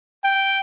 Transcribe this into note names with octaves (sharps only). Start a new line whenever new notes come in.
G5